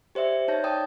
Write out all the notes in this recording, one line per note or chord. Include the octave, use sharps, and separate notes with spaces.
G4 C5 D5 E5
D#4 C#5 A5 G6 A#6
D5 G5 A5 D#6